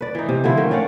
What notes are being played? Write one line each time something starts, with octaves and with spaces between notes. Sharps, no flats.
B4 D5
E3 D#4
C3
D3 F3 E4
D#3 A3 G5
C#4 D5 F5 F#5